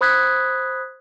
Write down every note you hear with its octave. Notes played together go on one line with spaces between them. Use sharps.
C5 B5 D#6 F#6 G#6 B6